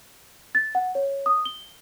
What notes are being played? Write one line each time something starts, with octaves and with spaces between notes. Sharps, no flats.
A6
F#5
C#5
D#6
G7